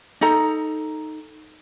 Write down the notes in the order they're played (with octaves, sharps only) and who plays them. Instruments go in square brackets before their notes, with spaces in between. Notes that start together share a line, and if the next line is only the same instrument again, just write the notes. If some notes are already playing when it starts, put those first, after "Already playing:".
[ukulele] D#4 A4 A#5